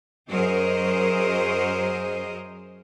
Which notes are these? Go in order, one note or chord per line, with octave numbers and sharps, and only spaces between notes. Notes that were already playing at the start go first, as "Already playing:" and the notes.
F#2 F#3 G#4 A#4 C5 D#5